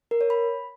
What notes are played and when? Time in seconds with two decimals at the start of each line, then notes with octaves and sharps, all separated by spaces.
0.11 A#4
0.21 C#5
0.30 B5